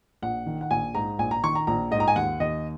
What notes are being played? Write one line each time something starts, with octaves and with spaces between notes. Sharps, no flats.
A#1 F#5
D#3
F#5
A#1 G#5
G#2 A#5
A#1 G#5
A#5
D#3 C#6
A#5
A#1 A#5
G#2 D#5
A#5
G#5
D#2 F#5
D#2 D#5